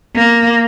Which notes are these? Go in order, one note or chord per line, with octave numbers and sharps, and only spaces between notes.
A#3